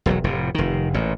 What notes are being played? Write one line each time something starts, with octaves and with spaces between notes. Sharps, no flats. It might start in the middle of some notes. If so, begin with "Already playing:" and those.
E1 B1 C3 F#3
F1 A2 C3
F1 D#3
A1 A#2